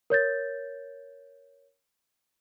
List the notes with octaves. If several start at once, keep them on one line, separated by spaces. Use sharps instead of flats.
A#4 C#5 G6 A6